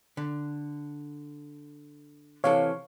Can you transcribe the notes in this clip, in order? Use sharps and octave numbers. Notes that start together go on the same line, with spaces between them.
D3
C3 E3 A4 C#5 F5